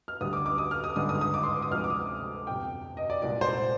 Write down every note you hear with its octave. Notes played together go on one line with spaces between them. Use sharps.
F6
D2 D3 G3 D#6
D6
D6
D#6
F6
D#6
G#1 G2 D3 G#3 D#6
D#6
D#6
D6
C6
D#6
D2 C3 F3 G#3 F6
D6
D#6
G1 F2 C3 G5
D#5
D5
C2 A#2 G#3 D5
C5